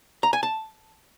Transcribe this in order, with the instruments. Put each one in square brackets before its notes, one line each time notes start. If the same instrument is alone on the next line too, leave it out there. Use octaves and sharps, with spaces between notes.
[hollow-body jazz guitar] A#5
G#5
A5